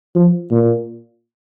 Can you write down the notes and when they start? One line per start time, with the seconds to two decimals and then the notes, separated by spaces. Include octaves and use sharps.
0.15 F3
0.51 A#2